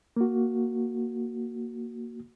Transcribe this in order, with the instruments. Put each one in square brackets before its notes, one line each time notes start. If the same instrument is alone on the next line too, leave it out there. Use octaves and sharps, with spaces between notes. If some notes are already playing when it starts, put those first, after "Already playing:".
[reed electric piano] A#3 F#4